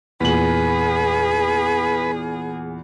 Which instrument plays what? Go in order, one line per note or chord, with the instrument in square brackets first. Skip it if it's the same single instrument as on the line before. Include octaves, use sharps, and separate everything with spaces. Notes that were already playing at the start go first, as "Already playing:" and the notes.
[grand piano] E2 A#2 F#7 [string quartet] G#4 [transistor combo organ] B4